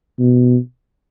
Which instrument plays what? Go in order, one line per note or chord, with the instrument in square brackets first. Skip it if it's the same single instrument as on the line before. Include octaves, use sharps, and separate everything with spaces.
[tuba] B2